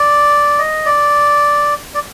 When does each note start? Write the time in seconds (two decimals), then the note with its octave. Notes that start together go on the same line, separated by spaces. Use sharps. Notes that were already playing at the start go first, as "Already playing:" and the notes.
Already playing: D5
0.59 D#5
0.86 D5
1.95 D5